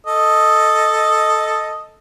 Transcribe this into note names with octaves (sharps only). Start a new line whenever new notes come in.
A4 D#5